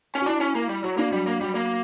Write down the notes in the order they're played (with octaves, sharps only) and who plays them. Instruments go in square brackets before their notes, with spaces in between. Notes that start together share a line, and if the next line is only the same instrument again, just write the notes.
[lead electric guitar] C#4
[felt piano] F#4
[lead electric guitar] D4 [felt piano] E4
[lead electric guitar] C#4
A#3
G3
[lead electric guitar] F#3 [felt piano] F#4
[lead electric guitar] A#3 [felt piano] D4
[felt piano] F#3 [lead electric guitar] G3
[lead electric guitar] A#3
[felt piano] F#3 [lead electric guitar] G3
[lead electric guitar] A#3